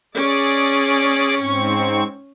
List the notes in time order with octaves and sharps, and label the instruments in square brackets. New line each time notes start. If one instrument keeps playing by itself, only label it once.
[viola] C#4 [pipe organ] G#4 D5 D6
[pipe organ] G#2 C4 C#6